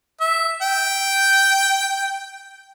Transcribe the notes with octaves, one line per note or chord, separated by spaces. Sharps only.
E5
G5